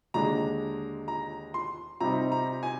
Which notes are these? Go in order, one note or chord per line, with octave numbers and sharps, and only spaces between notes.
D#2 D3 G#3 D4 A#5
A#5
C6
C3 G3 C4 D#4 A#5
A#5
G#5